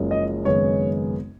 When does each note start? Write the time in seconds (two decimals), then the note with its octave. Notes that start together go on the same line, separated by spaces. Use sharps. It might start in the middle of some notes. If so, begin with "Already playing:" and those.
Already playing: F#1 F#2 F3 G#3 C#4
0.11 D#5
0.45 G#1 F#2 C#3 G#3 B3 C#5